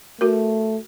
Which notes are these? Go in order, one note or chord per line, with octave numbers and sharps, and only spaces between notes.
A3 F#4 A#4